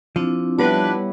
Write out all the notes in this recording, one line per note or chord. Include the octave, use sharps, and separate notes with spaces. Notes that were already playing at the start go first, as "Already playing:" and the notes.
F3 C4 D4 E4
G3 B3 D4 E4 G4 B4 C#5